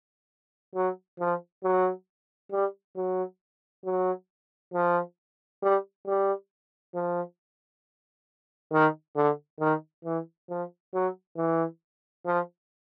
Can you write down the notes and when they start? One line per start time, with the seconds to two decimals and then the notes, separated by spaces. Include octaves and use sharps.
0.75 F#3
1.20 F3
1.64 F#3
2.52 G3
2.96 F#3
3.85 F#3
4.73 F3
5.62 G3
6.06 G3
6.95 F3
8.72 D#3
9.16 D3
9.60 D#3
10.05 E3
10.50 F3
10.94 F#3
11.37 E3
12.26 F3